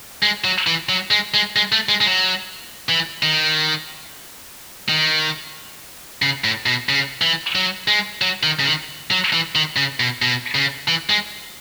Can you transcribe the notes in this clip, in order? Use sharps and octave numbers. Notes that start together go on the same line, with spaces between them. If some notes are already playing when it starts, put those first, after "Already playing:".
G#3
F#3
E3
F#3
G#3
G#3
G#3
A3
G#3
G#3
F#3
E3
D#3
D#3
C#3
A2
B2
C#3
E3
F#3
G#3
F#3
D#3
C#3
D#3
F#3
E3
D#3
C#3
B2
B2
C#3
E3
G#3